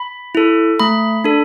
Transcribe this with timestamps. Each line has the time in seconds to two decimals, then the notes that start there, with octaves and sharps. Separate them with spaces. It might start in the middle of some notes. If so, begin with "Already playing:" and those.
Already playing: B5
0.35 E4 A4
0.79 A3 B5
1.24 D4 A4